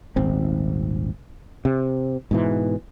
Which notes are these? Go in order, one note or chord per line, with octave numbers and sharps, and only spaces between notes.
D#1 G#1 C4
C3
G#2 B2 E3